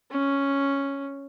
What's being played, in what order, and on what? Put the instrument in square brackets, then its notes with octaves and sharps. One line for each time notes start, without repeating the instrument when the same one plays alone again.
[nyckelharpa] C#4